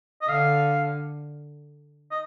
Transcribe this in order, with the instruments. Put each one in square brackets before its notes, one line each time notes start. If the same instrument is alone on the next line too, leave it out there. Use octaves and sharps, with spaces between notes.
[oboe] D#5
[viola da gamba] D3 [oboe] F5
[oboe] D#5